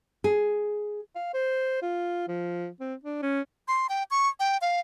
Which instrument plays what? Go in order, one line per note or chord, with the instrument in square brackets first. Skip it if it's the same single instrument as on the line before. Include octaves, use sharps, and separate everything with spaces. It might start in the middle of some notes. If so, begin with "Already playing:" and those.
[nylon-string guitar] G#4
[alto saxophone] F5
C5
F4
F3
C4
D4
C#4
[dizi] C6
G5
C#6
G5
F5